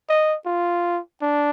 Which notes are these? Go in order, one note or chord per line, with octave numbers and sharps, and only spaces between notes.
D#5
F4
D4